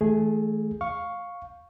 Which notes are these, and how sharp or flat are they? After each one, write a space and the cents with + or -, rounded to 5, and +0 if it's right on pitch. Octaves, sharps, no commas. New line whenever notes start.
E3 -40 A3 -25 G#4 +0
F5 +15 C#6 +0